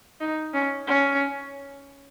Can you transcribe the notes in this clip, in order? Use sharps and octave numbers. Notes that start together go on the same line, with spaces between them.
D#4
C#4
C#4